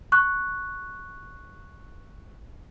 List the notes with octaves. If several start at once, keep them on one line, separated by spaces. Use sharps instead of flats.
C#6 F#6